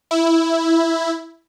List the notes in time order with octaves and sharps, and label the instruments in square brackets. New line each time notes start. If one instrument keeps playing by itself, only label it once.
[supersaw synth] E4